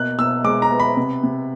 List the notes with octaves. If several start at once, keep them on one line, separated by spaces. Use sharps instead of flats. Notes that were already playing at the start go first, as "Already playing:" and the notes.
Already playing: B2 A#3 F#6
B2 E6
G#3 D6
A#5
B3
B5
C3
C3